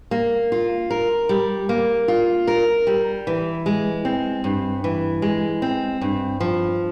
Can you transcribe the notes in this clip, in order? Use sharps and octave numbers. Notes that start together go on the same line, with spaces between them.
A#3
F4
A#4
G3
A#3
F4
A#4
G3
E3
G#3
C4
G2
E3
G#3
C4
G2
F3